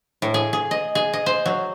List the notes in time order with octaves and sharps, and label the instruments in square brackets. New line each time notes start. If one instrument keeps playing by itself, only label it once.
[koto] A2
G#4
G#4
D#5
G#4
D#5
C5
F#3